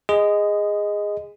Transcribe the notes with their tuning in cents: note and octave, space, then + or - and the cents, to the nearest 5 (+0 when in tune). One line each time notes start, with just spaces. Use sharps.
G#4 -15 D#5 +0 C6 -45